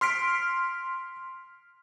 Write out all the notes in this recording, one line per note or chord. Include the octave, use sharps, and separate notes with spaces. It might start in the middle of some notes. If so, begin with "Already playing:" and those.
C6 F6 B6 D7